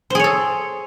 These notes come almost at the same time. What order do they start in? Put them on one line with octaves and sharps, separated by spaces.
C5 G#4 C#5 A4